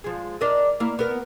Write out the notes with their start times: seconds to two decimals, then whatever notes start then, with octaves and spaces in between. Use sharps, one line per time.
0.04 F3 G#3
0.41 D4 A#4 D#5
0.80 A#3 E4
0.99 B3 A#4